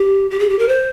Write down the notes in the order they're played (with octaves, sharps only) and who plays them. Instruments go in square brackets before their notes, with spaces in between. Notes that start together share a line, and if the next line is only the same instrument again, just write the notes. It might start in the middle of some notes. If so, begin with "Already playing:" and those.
Already playing: [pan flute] G4
G4
G#4
G4
A#4
C5